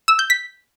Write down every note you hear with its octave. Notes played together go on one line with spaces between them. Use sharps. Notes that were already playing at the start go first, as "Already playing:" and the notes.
E6
G6
B6